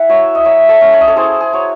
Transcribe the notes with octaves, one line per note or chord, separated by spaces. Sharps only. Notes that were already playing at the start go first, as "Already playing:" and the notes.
Already playing: E4 F#5 G#5
F#3 C#5 E5
D#5
F#3 C#5 E5
A4 C#5
C#4
C#5
D#5
A4 C#5
E4 G#4 C5
G#4
F#3 C#5